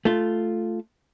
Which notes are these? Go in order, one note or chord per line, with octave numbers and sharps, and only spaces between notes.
A3 F4